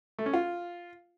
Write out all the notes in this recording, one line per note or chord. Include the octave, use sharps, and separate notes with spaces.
A3
C#4
F4